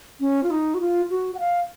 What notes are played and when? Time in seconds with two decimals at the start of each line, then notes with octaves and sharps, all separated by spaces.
0.20 C#4
0.43 F4
0.51 D#4
0.74 F#4
0.80 F4
1.10 F#4
1.35 F#5
1.39 F5